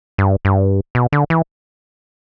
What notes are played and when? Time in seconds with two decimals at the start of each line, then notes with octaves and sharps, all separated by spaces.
0.18 G2
0.45 G2
0.95 B2
1.12 D3
1.30 E3